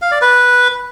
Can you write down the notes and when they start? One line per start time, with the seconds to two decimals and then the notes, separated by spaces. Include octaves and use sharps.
0.02 F5
0.12 D5
0.21 B4